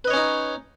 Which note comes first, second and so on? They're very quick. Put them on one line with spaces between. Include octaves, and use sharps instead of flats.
B4 D#5 C#5 C#4 D#4